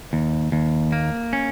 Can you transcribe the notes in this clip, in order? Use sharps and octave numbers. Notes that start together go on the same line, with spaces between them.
D#2
D#2
A#3
C#4